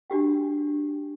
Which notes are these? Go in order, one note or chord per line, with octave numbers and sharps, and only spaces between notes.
D4 F#4 G4 G5